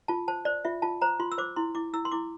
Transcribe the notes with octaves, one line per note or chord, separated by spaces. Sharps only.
F4 A5
C5 A5
C5 D5
F4 E5
F4 A5
C5 A#5
F4 C6
E6
C5 D6
E4 C6
E4 D6
E4 E6
C6
E4 D6